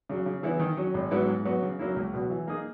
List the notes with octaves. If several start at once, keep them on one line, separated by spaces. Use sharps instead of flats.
C#3 F#3
C#3
E3 B3 E4
D#3
F#3 C#4
G#1
G#2 F#3 B3 E4
G#2
F#3 B3 F#4
C#3
F#3 A#3 C#4 E4
C#2
B2 F#3
E3
A#3 D#4 G#4